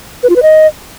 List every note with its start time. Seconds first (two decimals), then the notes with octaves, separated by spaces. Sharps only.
0.23 B4
0.30 F4
0.36 B4
0.42 D#5